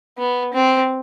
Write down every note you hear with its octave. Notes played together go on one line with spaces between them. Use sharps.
B3
C4